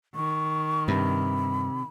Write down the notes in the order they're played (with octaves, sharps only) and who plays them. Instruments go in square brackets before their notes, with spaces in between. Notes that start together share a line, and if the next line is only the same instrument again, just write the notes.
[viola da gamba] D#3 [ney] C#6
[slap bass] G2 [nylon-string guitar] C3 [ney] B5